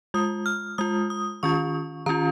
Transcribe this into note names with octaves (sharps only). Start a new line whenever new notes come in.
G#3 F4 D#6
F6
G#3 F4 D#6
D#6
D#3 C#4 F4 C#6
D#3 C#4 F4 A#5